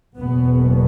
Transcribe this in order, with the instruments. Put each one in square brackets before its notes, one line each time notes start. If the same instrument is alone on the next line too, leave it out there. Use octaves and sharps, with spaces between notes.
[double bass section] F#1 E2 B2 B3